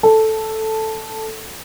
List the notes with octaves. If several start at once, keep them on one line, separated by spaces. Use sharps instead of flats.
A4